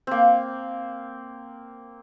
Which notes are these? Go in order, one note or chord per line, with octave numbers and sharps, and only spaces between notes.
A#3 C4